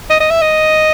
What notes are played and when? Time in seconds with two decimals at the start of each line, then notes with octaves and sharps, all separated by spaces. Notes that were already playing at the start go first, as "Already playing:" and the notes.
0.10 D#5
0.20 D#5
0.31 E5
0.42 D#5